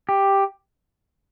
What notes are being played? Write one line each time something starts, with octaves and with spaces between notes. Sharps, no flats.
G4